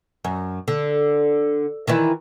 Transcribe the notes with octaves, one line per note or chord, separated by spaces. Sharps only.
F#2
D3
D#3 E3 E4